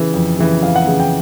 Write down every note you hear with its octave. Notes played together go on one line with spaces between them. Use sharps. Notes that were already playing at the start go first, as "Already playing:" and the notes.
Already playing: C#3 E3 E5
F2
C#3 E3
F2 F5
F#5
C#3 E3
G5